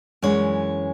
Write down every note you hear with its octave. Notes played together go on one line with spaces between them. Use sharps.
F#2 E3 G#3 C#4 C#5